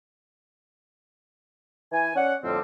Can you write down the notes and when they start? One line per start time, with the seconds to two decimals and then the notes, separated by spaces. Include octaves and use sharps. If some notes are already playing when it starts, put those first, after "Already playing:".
1.92 E3 G#5
2.16 C#4 D5 F#5
2.44 F2 A2 D3 G3 C4